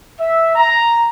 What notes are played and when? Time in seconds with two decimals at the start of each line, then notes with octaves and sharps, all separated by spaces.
0.19 E5
0.56 A#5